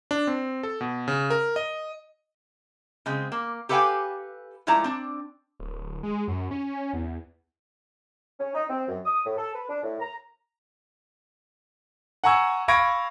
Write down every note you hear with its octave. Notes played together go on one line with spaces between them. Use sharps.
D4
C4
A4
B2
C#3
A#4
D#5
C#3 G#3 C4
A#3
G4 A4 B4 F5 G5 G#5
A2 F3 G#3 E4 D5 A#5
C4 D4
D1
G#3
F#2
C#4
E2
C#4
D#4
C4
F#2
D#6
A2
A4
B4
D4
A2
A#5
F#5 G#5 A#5 C#6 E6 G#6
F5 B5 C#6 G#6 A#6 D7